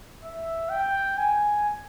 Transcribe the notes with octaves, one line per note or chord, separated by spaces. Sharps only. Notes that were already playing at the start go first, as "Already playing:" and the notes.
E5
G5
G#5